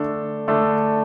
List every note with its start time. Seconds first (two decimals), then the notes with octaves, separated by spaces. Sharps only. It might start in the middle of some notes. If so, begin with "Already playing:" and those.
Already playing: D3 A3 D4 A4
0.48 D3 A3 D4 A4